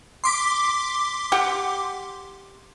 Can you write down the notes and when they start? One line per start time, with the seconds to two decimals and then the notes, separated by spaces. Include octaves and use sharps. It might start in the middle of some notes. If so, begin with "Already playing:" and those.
0.24 C6 D6 B6
1.32 G4 F#5 G5